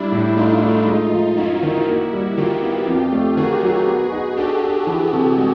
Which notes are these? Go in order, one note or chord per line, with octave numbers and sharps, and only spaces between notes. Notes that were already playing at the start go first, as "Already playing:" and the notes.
Already playing: G3 D4 E4
A2
A3 D#4 F4
A3
G#3
F3
F#2 E4 F#4
D#3
A#3
G3
D#3 F4 G4
B3
F2
A3
D#3 F#4 G#4
F#3
B3
D#4
D4 G4 A4
D4
E3
C3
G#3